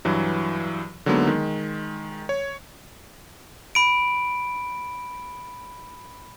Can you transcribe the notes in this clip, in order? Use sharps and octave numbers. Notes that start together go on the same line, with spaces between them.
G2 E3 F#3
D3 F#3 G#3 A#3 B3 D#4
D#3 G#3
C#5
B5 D7